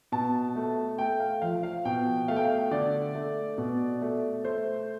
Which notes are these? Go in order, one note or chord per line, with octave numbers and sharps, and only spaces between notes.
B2 A5
A3
A3 G5
F5
F3 F5
F5
B2 G5
A3 F5
G5
F5
D3 D5
A3
B2
A3
A3 C5